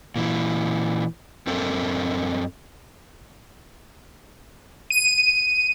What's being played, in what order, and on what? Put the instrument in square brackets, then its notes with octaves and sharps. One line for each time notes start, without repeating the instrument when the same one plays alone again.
[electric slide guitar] A#2 E3
F#2 C4 A4 A#4
[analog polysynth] D#7